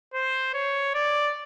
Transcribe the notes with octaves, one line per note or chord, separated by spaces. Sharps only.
C5
C#5
D5